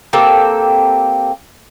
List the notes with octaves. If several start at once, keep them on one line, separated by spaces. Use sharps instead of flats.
A#3 C4 G4 A4